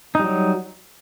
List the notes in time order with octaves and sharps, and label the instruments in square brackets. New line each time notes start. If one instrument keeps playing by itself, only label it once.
[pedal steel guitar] D#4
G3
F#3